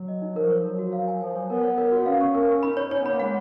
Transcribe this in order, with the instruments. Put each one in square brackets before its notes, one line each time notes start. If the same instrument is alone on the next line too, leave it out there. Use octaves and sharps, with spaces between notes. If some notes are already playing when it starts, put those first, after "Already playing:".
Already playing: [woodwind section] F#3
[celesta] D#5
D#4
[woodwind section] F3 [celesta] A#4
[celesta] C#5
[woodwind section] F#3 [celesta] A#4
[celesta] F#4
F5
G#5
[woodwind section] F3 [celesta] G#5
[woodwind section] F#3 [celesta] C#5
[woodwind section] B3 [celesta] A#4
[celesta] C#5
A#4
F#4
[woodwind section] C#4 [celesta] F5
[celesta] C#6
A#4
C#6
[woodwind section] D#4 [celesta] B5
[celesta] C#5
[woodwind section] C#4 [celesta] C#5
[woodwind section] B3
[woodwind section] A#3 [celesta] B5
[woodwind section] G#3 [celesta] F#5